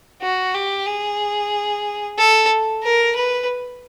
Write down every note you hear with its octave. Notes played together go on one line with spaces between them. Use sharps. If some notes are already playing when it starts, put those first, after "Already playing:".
F#4
G4
G#4
A4
A#4
B4